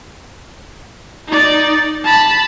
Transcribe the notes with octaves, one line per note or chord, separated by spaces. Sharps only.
D#4 D5
A5 B5